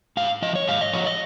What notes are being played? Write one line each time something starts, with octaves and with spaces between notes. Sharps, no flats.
G#2 F5
F3 D#5
C#5
G#2 F5
D#5
F3 C#5
D#5